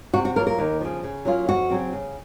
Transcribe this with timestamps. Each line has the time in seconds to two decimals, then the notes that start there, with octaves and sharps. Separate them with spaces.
0.14 C3 F#4
0.25 F#4
0.36 F#3 A#3 F4 A#4
0.47 A#4
0.59 D#2
0.80 C#3 F3
1.03 C#3
1.25 F#3 A#3 C#4 F4
1.48 F2 F#4
1.70 C#3 F#3 C4
1.93 C#3